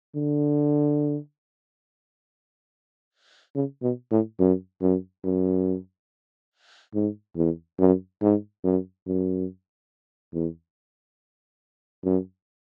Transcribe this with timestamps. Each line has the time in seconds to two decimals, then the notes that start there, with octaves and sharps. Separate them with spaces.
0.15 D3
3.55 C#3
3.83 B2
4.11 A2
4.40 F#2
4.82 F#2
5.24 F#2
6.95 G#2
7.37 E2
7.79 F#2
8.22 G#2
8.64 F#2
9.07 F#2
10.34 E2
12.04 F#2